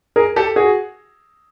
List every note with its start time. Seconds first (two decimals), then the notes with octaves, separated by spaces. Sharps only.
0.16 G#4 A#4
0.36 G4 A4
0.56 F#4 G#4